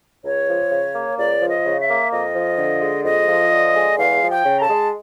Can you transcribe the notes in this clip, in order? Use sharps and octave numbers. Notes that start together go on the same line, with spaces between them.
C#2 C#5
F3
C#3
A#3
C#2 D5
F3
D#5
C#3
E5
A#3
F2 D#5
F3
D3
G#3
F2 D#5
F3
D3
G#3
E2 F5
F3
G5
C#3
A#5
A5
G#3